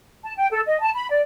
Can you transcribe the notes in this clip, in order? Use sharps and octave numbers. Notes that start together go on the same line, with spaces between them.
A5
G5
A4
D#5
A5
B5
D5